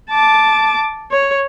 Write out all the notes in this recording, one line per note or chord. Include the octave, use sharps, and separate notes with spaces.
A5 D6
C#5